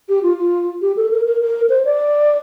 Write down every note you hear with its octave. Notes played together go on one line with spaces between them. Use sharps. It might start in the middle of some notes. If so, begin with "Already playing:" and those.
G4
F4
F4
G4
A4
A#4
A#4
A#4
C5
D5